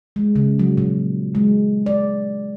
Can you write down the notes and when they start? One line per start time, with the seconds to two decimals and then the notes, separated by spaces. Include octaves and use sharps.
0.16 G#3
0.36 C#3
0.59 F#3
0.77 A#2
1.35 G#3
1.86 D5